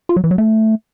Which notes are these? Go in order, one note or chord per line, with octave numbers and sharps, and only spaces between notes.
F4
F#3
E3
F#3
A3